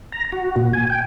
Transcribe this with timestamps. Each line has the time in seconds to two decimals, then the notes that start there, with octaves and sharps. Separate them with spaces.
0.12 A#5
0.32 F#4
0.56 A#2
0.73 G#5
0.90 G5